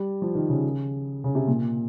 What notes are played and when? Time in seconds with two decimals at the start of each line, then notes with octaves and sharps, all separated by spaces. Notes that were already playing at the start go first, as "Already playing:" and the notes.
Already playing: G3
0.22 F3
0.35 D#3
0.49 C#3
1.24 C#3
1.35 C3
1.48 A#2